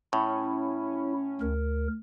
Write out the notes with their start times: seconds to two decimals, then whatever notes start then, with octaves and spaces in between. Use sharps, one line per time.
0.13 A2 C#4 E4
1.41 D2 A#4